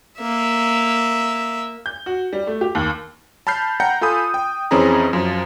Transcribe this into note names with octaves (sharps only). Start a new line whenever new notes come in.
A#3 E5
G6
F#4
G3
A3
G4
D#2
A5 B5 F6 G6 C7
F#5 G5 A#5 G6 C#7
F4 A4 G#5 B5 D#6
G5
F2 E3 C4 C#4 G#4 A#5
F#2 F3